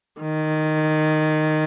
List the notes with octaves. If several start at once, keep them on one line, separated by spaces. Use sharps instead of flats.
D#3